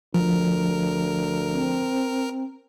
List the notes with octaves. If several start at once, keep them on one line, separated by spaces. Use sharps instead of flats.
D2 F3 A#4
C4